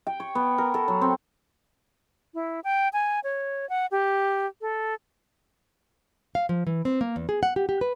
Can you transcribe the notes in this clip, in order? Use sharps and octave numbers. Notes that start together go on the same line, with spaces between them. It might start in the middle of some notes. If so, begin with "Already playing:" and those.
G5
C#5
B3
A#4
A4
F#3
C4
E4
G5
G#5
C#5
F#5
G4
A4
F5
F3
E3
C4
A#3
E2
G#4
F#5
G4
G4
B4